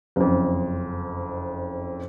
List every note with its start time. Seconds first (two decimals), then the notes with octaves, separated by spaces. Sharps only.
0.16 F#1 F2